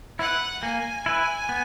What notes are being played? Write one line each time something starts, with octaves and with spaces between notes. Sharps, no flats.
E4 F#5
B4
A#3 G#5
E4 B4
B3